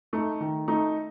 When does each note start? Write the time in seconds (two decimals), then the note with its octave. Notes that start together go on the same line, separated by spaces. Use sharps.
0.13 A3 D#4
0.41 D#3
0.68 A3 D#4